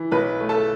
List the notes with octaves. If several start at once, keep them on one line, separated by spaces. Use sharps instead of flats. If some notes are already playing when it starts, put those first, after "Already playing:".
Already playing: E3
B1 B4 B5
A3
A4 A5